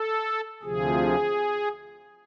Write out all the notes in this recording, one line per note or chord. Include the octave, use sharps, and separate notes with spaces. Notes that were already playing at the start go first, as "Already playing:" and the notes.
Already playing: A4
D2 C3 F3 G#4